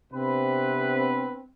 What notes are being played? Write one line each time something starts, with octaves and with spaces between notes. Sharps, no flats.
C3 B3 C4 D4 B4